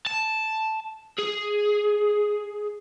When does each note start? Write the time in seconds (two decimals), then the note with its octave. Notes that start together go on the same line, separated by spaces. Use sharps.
0.06 A5
1.19 G#4